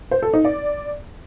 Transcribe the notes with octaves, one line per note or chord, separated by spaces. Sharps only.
C5
A4
D#4
D5